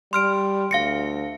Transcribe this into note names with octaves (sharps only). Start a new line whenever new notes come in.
G3 C6 F6 D7
D2 F5 A#6 C#7